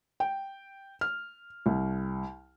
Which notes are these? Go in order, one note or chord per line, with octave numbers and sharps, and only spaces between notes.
G5
F6
C2